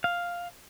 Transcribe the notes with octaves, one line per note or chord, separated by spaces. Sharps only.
F5